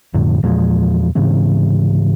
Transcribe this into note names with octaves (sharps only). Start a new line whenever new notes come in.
F2 A2 D3
E2 A#2 F3 G#3
G#2 C#3 E3 C4